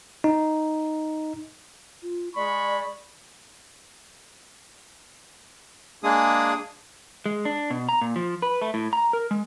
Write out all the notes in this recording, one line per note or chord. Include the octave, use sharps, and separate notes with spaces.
D#4
F4
G#3 D5 B5 C#6
G#3 A#3 D4 G#4 D#6
G#3
D4
B2
A#5
A#2
F3
B4
A3
A2
A#5
A#4
G#3